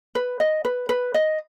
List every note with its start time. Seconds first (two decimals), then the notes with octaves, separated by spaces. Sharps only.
0.15 B4
0.40 D#5
0.65 B4
0.89 B4
1.14 D#5